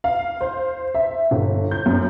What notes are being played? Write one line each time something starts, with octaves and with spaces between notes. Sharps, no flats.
F5
C5
E5
G1
G6
F#2